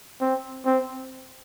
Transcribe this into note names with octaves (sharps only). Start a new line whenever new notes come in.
C4
C4